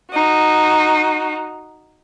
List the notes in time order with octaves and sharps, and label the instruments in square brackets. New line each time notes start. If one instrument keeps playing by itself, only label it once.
[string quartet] D#4 F#4